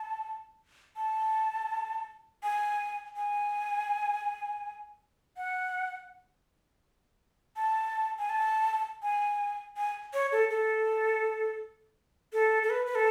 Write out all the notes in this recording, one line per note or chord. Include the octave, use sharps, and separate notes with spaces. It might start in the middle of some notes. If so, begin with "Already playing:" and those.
Already playing: A5
A5
G#5
G#5
F#5
A5
G#5
A5
G#5
G#5
C#5
A4
A4
A4
A4
B4
B4
A4